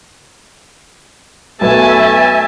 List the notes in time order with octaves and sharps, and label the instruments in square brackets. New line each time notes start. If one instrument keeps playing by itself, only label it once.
[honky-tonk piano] B1 B3 [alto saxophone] A3 [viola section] E5 G#5 [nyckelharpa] A5